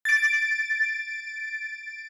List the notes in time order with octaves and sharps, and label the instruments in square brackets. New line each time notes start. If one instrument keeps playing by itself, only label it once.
[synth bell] A6 D7